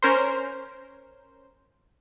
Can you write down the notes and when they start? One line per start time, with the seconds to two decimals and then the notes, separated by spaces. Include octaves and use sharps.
0.02 C#4 A#4 C5